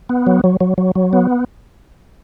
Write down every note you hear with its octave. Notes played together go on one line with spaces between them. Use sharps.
B3
F#3
F#3
F#3
F#3
F#3
B3